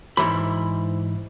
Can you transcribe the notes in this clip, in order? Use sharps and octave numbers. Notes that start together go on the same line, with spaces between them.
G#2 E3 B5